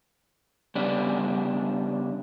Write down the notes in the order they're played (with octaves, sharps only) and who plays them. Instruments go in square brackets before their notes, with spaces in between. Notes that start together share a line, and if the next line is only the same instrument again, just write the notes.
[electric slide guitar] C#3 G3 B3 D4